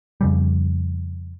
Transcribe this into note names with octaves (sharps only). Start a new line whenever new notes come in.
F2 C#3 G3